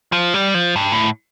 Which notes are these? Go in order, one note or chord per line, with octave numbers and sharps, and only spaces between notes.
F3
G3
F3
G2
A2